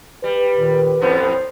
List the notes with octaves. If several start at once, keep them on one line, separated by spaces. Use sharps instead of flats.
G3 B4
D#2 A#2 D#3
E2 A2 B3 C5